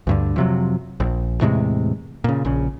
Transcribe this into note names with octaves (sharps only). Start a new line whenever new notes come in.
D2 G2 D3
F2 C3 F#3
A#1
E2 A2 C3 G#3
A#2 C#3
A#1 C#3